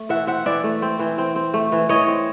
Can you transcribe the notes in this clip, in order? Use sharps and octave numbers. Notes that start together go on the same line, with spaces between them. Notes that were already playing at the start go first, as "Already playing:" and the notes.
Already playing: A3
E3 E5 F#5
C4 E5 F#5
E3 D5 E5
A3
C4
E3
C4
C4
A3
E3
E3 C#5 D#5
C4